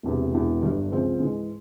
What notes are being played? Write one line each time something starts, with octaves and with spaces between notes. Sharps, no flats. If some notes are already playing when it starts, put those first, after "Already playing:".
E1 E2 C3
E1 E2 E3
G1 G2 G3
C#2 C#3 F3 C4
G#2 E3 G#3